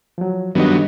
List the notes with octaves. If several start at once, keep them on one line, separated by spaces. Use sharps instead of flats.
F3 F#3
G2 D#3 F#3 B3 F#4 A4 D#5